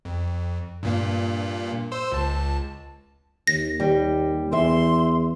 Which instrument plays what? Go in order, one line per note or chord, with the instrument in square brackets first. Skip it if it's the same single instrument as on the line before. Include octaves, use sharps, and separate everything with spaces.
[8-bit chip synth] F2
G2 A#2 A#3
C5 C6 E6
C#2 A5
[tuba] D#2 [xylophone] A#6
[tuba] D#2 [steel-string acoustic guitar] G3
[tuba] E2 [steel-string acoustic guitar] E3 E5 [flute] C6